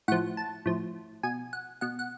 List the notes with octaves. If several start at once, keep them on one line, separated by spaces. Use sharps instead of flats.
A2 F3 F#5
A5
A2 F3
B2 G#5
F#5
B2 F#5
F#5